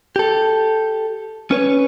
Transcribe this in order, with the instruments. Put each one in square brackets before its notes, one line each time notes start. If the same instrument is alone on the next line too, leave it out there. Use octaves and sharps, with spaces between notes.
[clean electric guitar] G4 A4
C#4 B4 C#5